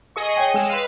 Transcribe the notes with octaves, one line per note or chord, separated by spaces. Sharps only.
G#4 D#5 C#6
C#5 G5 G#5
G#3 E6 E7
B4 F5 D#7